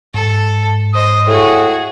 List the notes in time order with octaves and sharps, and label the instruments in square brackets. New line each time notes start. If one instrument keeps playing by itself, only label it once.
[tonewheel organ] G#2 [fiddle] A4
[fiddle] C5 D#5 [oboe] D#6
[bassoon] A2 [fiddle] F#4 G#4